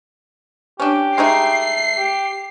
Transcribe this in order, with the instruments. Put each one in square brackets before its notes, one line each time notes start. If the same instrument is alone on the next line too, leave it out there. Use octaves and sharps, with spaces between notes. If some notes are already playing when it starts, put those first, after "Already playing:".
[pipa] C#4 D4 [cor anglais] G4
[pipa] G#3 A3 D#4 [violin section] C7
[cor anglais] G4